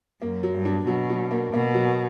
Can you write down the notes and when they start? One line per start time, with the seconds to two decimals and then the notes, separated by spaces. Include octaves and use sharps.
0.21 F#2 A#3
0.43 F#3
0.54 G2
0.65 D4
0.87 B2 F#3
1.10 F#3
1.31 A#3
1.53 B2 A#3
1.74 F#3